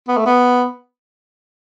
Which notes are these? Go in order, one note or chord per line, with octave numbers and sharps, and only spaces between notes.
B3
A3
B3